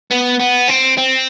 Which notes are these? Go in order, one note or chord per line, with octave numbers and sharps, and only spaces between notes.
B3
B3
C4
C4